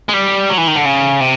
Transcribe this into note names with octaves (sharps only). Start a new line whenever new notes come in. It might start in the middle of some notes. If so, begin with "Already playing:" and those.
G#3
G3
F#3
E3
D#3
D3
C#3
C3